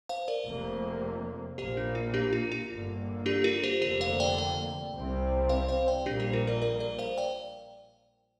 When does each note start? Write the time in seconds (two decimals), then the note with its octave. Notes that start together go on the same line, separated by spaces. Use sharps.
0.09 C5 F5
0.28 A#4 D5
0.46 F1 F2 C3 A#3
1.58 A#1 A#2 A#3 G4 C5
1.77 D4
1.95 F4
2.14 D4 G4
2.33 F4
2.52 F4
2.71 G1 G2 D3 A#3
3.26 D4 G4
3.44 F4 A#4
3.64 G4 C5
3.82 F1 F2 D3 A#3 G4 C5
4.01 C5 F5
4.20 D5 G5
4.38 D5 G5
4.94 C2 C3 G3 C4
5.49 C5 F5
5.68 C5 F5
5.88 D5 G5
6.05 A#1 A#2 G3 A#3 D4 G4
6.20 G4 C5
6.33 F4 A#4
6.47 A#4 D5
6.62 A#4 D5
6.80 A#4 D5
6.99 C5 F5
7.18 D5 G5